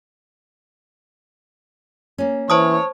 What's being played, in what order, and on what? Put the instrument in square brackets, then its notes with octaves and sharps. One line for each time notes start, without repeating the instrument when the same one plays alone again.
[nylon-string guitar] A#3 C#4
[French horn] E3 [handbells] C5 A5 D#6 [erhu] C#5